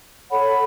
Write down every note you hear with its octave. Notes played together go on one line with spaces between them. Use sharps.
A4 C#5 F#5 B5